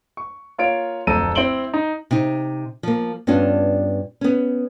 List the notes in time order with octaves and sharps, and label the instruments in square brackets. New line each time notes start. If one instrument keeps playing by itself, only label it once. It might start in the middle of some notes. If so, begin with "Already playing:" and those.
[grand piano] C#6
A#3 F4 C#5 D7
D1 F2 A4 A#5 D#7
C4 E4 C6 D7 F#7 G7
D#4
[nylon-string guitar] C3 D#4
F3 A#3
G2 B3 C#4 D4 F4
B3 C#4